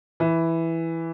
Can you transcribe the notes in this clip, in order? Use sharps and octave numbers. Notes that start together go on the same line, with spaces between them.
E3